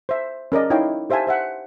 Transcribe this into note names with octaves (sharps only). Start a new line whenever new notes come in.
C5 E5
C#4 A#4 D5 D#5
D#4 E4 C#5 D#5 F5 G5
G4 C5 E5 F5 G#5 A5
C5 E5 F#5